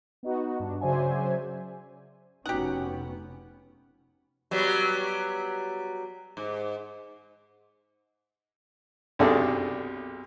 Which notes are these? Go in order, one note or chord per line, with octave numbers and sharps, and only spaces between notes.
B3 D#4 F#4
G2 D4
C#3 F#3 C5 D5 E5 G#5
F1 B3 C#4 D#4 F#4 G4 F#5 A#5
F#3 G3 B3
G#2
B1 F#2 C3 D4 G#4 A4